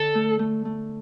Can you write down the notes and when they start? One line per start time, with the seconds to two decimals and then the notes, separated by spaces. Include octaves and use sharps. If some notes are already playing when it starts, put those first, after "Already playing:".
Already playing: D3 A4
0.15 A3
0.39 A3
0.65 A3